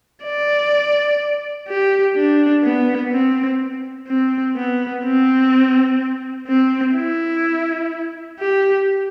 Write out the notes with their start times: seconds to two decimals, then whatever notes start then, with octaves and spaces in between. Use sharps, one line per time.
0.24 D5
1.68 G4
2.16 D4
2.64 B3
3.12 C4
4.08 C4
4.56 B3
5.04 C4
6.47 C4
6.95 E4
8.39 G4